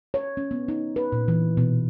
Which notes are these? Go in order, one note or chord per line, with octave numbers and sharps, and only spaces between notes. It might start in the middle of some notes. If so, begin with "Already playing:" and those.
C#5
C#4
B3
D#4
B4
A#2
E3
B2